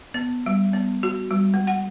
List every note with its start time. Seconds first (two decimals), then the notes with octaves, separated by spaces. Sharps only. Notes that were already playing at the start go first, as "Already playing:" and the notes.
0.14 B3
0.46 G3
0.73 B3
1.03 F#4
1.31 G3
1.54 G#3
1.67 F#5